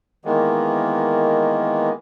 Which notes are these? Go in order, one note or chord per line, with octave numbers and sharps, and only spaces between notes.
D#3 E3 G#3 A#3 B3